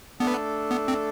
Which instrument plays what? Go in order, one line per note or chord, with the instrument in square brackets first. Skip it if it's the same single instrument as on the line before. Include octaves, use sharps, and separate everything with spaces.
[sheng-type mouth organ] A3 D4 A4 [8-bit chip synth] B3
[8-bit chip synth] B3
C4